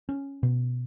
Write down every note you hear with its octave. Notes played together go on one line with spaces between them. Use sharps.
C#4
B2